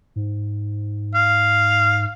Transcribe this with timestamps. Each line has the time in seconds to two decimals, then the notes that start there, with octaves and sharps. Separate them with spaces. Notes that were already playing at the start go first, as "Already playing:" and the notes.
0.16 G#2
1.15 F5